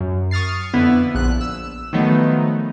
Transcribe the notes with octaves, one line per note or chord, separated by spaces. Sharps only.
F#2
C#6 D#6 F6 A6 C7
F2 D3 B3 E4
A#1 F#6
E6
D#3 F3 F#3 A3 B3 D#4